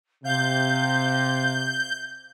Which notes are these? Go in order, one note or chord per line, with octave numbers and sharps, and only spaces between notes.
C3 F5 G6